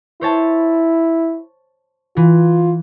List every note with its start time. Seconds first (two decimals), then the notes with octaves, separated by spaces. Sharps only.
0.21 E4 C5 C#5 A5
2.17 E3 F4